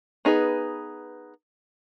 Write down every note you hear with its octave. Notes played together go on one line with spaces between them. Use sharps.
B3 D#4 G#4 B4